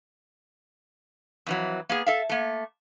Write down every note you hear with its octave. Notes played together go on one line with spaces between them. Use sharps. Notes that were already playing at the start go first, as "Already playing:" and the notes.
F2 E3 F#3
A#3 B3 G#4
A4 E5 F5
A3 A#3